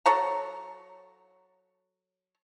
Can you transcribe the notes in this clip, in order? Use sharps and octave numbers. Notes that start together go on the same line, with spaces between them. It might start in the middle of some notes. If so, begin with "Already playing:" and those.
F#3 A4 C#5 A#5